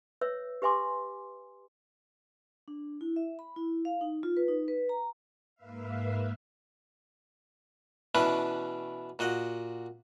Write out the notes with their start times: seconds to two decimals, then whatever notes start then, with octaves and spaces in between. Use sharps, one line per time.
0.21 B4 C#5 E5 E6
0.62 G4 B4 E5 G#5 C6 D6
2.68 D4
3.01 E4
3.16 E5
3.39 B5
3.56 E4
3.85 F5
4.01 D#4
4.23 F4
4.37 B4
4.48 D#4
4.68 B4
4.89 A#5
5.55 G#2 A#3 B4 E5 F5
8.15 B2 E3 C#4 D4 E4 B4
9.19 A#2 F#4 D#5 F#5